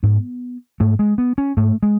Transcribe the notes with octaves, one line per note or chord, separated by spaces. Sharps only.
G#2 B3
G#2 A3
G#3
B3
C#4
G#2 A3
G#3